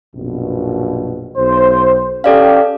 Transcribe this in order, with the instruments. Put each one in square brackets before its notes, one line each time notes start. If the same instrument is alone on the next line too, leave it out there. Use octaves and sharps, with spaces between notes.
[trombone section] A#1 F#2 B2
B1 C5
[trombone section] C#4 G4 [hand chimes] A4 D5 F5